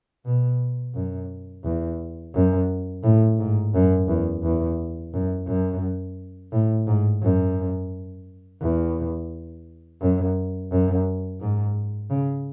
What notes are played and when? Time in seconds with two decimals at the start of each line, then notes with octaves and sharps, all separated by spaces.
0.25 B2
0.95 F#2
1.64 E2
2.34 F#2
3.04 A2
3.39 G#2
3.74 F#2
4.08 E2
4.43 E2
5.14 F#2
5.47 F#2
6.52 A2
6.87 G#2
7.22 F#2
8.61 E2
10.01 F#2
10.71 F#2
11.40 G#2
12.10 C#3